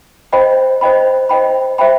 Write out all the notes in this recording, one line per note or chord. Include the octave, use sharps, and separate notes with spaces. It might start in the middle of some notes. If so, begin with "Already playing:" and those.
C5 D#5 G5 B5
C5 D#5 G5 B5
C5 D#5 G5 B5
C5 E5 G5 B5